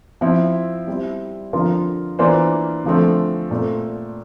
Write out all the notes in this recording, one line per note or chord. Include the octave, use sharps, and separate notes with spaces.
F3 C4 E4
G3 C4 E4
D3 F3 C4 F4 A#4
E3 A#3 D4 F4 C5
D3 F3 A3 C4
A#2 A3 C4